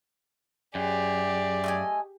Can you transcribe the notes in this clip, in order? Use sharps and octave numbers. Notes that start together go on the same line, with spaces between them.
F#2 G4 G#4 D5
A3 D#5 G#5